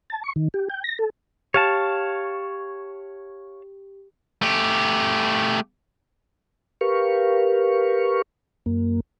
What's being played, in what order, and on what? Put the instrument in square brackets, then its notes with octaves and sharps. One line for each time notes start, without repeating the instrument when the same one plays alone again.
[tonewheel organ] A5
C#6
D#3
G4
G5
A#6
A4
[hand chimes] G4 [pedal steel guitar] C#5 F5 A5
[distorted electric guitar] A3 G4
[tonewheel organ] G4 A#4 B4 F5 C#6
F#2 A#3